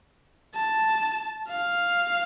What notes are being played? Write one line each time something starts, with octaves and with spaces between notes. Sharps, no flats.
A5
F5